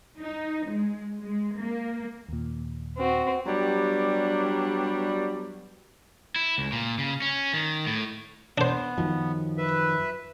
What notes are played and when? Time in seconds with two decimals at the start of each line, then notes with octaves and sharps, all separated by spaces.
0.19 D#4
0.69 G#3
1.22 G#3
1.58 A#3
2.29 D#2 A#2
2.97 C4 F#4
3.46 F#3 G3 B3 D4 G4
6.36 E4
6.58 C#2
6.72 A#2
6.99 C#3
7.22 C#4
7.54 D#3
7.87 A2
8.58 B3 D4 C5
8.98 F#2 D#3 F3
9.58 B4 E5